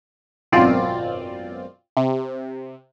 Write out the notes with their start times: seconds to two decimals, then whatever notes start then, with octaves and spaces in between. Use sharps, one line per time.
0.52 G#1 F#2 B2 C4 F4 D5
1.97 C3